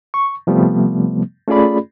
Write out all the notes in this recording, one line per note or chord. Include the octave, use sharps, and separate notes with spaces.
C#6
C3 F3 G3 A3 B3
A3 C#4 F4 G#4 D5 B5